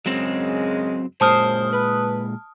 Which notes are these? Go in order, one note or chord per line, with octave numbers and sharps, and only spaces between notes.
F#2 C#3 F#3 G#3 C4
F#2 A#2 G#3 C5 A5 D#6 F6
B4